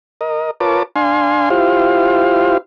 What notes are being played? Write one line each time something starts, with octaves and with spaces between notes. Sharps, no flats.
A#4 D#5
F4 A#4 B4 C#5 A5 D6
D4 F5 G#5 C6
E4 F4 G4 C5 F5